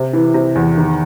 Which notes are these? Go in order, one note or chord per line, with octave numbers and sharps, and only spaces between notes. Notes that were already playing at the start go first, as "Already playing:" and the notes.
Already playing: C3
E3
C3
E2
D#3